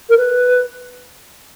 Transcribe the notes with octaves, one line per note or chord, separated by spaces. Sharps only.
A#4
B4